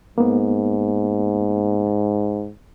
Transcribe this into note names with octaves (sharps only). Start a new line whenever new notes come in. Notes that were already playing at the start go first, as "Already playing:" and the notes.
G#2 A#3 B3